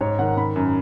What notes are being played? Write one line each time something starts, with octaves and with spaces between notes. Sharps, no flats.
G#2 C#5
D#3 F#5
D#3 B5
F#2